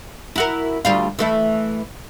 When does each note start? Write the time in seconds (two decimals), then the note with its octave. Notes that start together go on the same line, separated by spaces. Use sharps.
0.36 E4 F#4 A#4
0.85 D2 G3 F4
1.19 E3 A3 E4